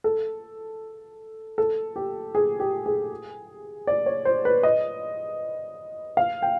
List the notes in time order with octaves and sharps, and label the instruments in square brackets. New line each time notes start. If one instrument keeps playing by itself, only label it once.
[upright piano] A4
A4
G4
G#4
G4
G#4
D5
C#5
C5
B4
D#5
F5
G5